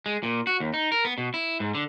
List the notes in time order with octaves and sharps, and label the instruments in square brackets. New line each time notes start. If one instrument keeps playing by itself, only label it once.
[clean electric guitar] G#3
A#2
F#4
D#2
D#4
A#4
B3
B2
E4
G#2
D3